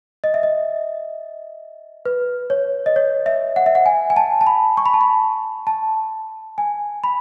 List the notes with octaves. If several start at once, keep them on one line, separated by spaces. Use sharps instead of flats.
D#5
E5
D#5
B4
C#5
D#5
C#5
E5
F#5
E5
F#5
G#5
G#5
A5
A5
B5
C#6
B5
A5
B5
A5
G#5
B5